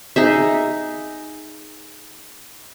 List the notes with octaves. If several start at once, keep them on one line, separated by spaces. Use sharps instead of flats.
D#4 G#4 E5